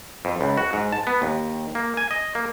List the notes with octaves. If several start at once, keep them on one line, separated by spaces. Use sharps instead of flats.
F2
C#2
F#4
G#2
A5
B3
D#2
A#3
G#5
D#5
A#3